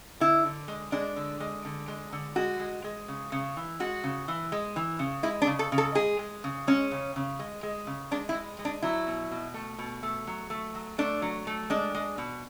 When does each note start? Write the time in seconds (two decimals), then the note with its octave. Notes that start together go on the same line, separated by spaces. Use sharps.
0.20 D3 E4
0.45 D3
0.68 G#3
0.92 G#3 D4
1.16 D3
1.40 G#3
1.65 D3
1.88 G#3
2.13 D3
2.36 G#3 F#4
2.60 G#3
2.84 G#3
3.08 C#3
3.32 C#3
3.57 E3
3.80 G#3 F#4
4.04 C#3
4.28 E3
4.52 G#3
4.76 E3
4.99 C#3
5.23 G#3 E4
5.42 D4
5.47 C#3
5.59 A4
5.72 C#3
5.78 A4
5.95 G#3 G#4
6.19 G#3
6.44 C#3
6.67 G#3 C#4
6.91 C#3
7.16 C#3
7.39 G#3
7.63 G#3
7.87 C#3
8.11 G#3 D4
8.29 E4
8.35 G#3
8.59 G#3
8.65 D4
8.82 F#3 E4
9.07 B2
9.31 B2
9.54 A3
9.78 B2
10.03 A3
10.27 F#3
10.50 A3
10.75 F#3
10.98 A3 D4
11.22 F#3
11.47 A3
11.70 G#3 D4
11.95 G#3
12.18 B2